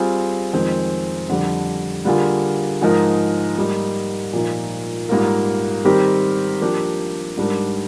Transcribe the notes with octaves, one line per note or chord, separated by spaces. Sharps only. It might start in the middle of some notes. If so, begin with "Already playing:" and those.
Already playing: G3 C4 F4 G#4
F2 D#3 G#3 C4 F4
F2 D3 G3 D4
D3 G3 A#3 F4 G#4
G#2 F3 G#3 D#4 A#4
G#2 G3 A#3 D#4
A#2 F3 A#3 D#4
G#2 G3 A#3 F4 A#4
D#3 G3 C4 G4 A#4
F3 A#3 D4 G4
G#2 G3 D4 G4 A#4